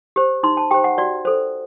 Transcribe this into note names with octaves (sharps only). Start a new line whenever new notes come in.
G4 C5
D#4 C6
A5
G4 C5 G5
F#5
F#4 D5
A4 C5